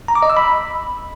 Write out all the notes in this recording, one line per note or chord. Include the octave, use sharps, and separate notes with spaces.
A#5
D6
D#5
E6
B5